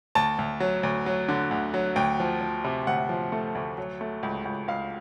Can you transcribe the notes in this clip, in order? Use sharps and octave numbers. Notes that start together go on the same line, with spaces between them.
D2 A5
D2
F#3
D2
F#3
D3
D2
F#3
D2 G5
F3
F3
C3
D2 F#5
F3
A3
D2
F#3
A3
C#2
C#2
C#2 F5